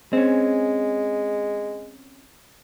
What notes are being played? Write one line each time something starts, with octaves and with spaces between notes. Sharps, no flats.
G#3 C4 C#4